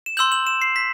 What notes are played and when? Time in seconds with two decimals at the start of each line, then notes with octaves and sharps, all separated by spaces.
0.06 E7
0.17 C6 E6 G6 F#7
0.32 F#7
0.47 E7
0.62 C7
0.76 B6